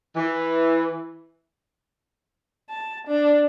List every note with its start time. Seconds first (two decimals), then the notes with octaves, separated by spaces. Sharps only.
0.15 E3
2.70 A5
3.07 D4